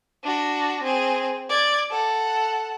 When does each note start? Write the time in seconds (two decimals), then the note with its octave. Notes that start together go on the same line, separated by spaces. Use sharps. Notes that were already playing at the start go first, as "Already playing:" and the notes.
0.23 D4 F#4
0.83 C4 G#4
1.49 D5 G#6
1.91 A4 F#5